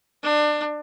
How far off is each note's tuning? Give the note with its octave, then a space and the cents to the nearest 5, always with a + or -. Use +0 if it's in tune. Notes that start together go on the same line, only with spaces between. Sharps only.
D4 +25